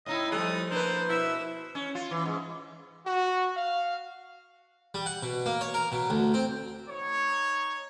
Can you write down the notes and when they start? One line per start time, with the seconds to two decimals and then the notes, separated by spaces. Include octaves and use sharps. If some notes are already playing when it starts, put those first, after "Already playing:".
0.06 A2 D#4 E4 D#5
0.32 F3 G3 A3 D#5 D#6
0.71 A#3 D4 E4 B4 C5
1.09 B2 E4 E5
1.75 C#4
1.95 F4
2.11 E3
2.26 G#2
3.05 F#4
3.55 F5
4.94 G3
5.06 F#5
5.23 B2
5.46 A#3
5.61 C#5
5.74 A#4
5.92 B2
6.10 D2
6.34 C4
6.88 D#4 C#5